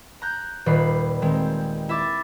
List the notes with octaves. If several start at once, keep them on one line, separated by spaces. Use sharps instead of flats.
A#5 F#6 G6
D#1 A#2 D#3 B4 C7
D#3 G#3 C4
E4 E5 D6 A6